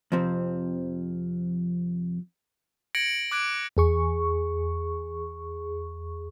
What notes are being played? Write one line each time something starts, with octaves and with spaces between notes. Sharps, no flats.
F2 C3 F3 C4
G#6 A#6 C#7 D7 F#7
D6 F#6 G#6 D7
E2 G#4 C#6